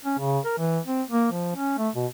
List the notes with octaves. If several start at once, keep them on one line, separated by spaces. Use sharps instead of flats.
C#4
C#3
A#4
E3
C4
A#3
F3
C#4
A3
B2